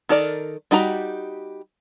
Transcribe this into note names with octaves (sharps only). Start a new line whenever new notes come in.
D#3 A4 A#4 D5
G3 D#4 F#4 G4 A#5